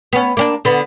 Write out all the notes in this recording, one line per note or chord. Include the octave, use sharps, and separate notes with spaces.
B3 C#4
A#3 C#4 D4
D3 B3